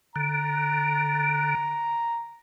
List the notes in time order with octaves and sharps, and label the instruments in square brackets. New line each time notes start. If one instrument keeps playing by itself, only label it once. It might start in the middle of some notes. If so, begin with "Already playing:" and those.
[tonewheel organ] D3 [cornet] A#5